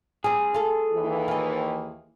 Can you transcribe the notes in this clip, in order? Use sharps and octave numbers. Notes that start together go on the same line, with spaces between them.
G3 C4 G#4
F4 A4
D#2 E3
F4 D#5